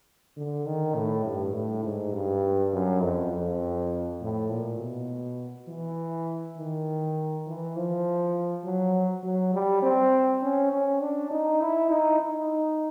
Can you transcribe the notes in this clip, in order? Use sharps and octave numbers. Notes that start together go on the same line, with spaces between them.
D3
D#3
A2
G2
A2
G#2
G2
F#2
F2
F2
A2
A#2
B2
E3
D#3
E3
F3
F#3
F#3
G3
C4
C#4
C#4
D4
D#4
E4
D#4
D#4